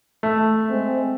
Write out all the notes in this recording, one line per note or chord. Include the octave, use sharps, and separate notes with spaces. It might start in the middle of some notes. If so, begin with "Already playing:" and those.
A3
G#3 C4